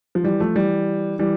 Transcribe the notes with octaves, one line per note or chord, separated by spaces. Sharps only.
F3
E3 G3
F3 A3
E3 G3
E3 G3